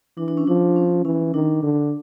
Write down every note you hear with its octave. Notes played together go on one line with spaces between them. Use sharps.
E3 D4
D4
C#4
F3 D4
C#4
E3 C#4
D#3 D4
D3